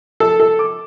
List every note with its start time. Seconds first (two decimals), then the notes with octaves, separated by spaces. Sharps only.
0.20 A4
0.40 A4
0.59 D6